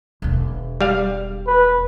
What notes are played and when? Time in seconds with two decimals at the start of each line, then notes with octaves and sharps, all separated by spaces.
0.22 E1 D3
0.81 G3 F5
1.47 B4